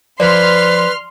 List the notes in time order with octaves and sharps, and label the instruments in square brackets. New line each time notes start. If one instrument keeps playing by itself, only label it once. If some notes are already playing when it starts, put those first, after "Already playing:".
[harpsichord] F3 [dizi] B4 [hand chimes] D5 [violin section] C6 F6